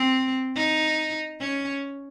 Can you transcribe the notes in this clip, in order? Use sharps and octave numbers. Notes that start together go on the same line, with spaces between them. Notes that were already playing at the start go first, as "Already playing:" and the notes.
Already playing: C4
D#4
C#4